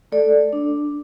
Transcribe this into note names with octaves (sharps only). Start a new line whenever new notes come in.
A3 A4 D5
D4